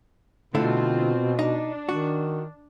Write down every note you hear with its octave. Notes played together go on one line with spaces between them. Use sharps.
B2 D3 A3 C4 E4 F4
D4 D#4
D#3 F#4